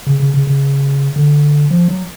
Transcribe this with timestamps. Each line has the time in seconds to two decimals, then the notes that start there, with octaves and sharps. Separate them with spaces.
0.07 C#3
0.20 C#3
0.34 C#3
0.47 C#3
1.16 D3
1.71 F3
1.88 F#3